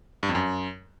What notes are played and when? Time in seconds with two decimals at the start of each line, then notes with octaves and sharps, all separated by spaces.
0.23 G2
0.29 F2
0.35 F#2